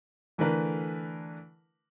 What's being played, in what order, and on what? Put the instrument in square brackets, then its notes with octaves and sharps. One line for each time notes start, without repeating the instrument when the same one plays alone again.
[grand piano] D3 E3 A3 D4 A#4 B4